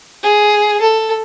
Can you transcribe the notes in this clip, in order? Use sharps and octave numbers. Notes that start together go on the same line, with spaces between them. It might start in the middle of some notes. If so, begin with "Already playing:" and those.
G#4
A4